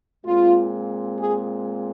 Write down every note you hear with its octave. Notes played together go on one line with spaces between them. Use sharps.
A#2 G#3 C4 F4
G#4